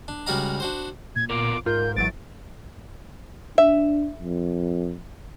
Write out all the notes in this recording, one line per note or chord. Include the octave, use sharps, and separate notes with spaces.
D4
C#2 G3 F#4 D5 F5 A#5
D4 F#4 C5
A#2 G#6
B3 F4 A#4 D6
G#2 F4 A#4 G6
G#1 E3 F#3 A6 D7
D4 E5
F2